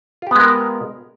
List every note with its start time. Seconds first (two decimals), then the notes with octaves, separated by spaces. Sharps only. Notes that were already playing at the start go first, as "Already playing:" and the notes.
0.22 F4
0.27 G4
0.31 B3
0.36 G#3
0.40 A#4